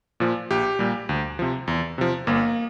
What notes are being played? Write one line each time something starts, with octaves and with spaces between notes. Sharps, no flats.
A#2 F3
A#1 G4
A#2 G3
D2
C3 F3
E2
C3 F3
G1 A#3